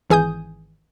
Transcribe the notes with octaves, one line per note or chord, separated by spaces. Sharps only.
G#1 E3 G#4 G#5 D#6 G6